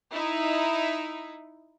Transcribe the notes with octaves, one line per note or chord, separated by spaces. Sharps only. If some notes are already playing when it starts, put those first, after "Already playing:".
D#4 E4